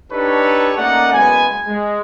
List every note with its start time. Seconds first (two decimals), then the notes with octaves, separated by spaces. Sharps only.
0.12 D4 D#4 G4 A4 B4 C#5
0.77 A3 A#3 C#4 D#4 D5 F#5
1.13 F#1 G#3 B3 G#5
1.67 G#3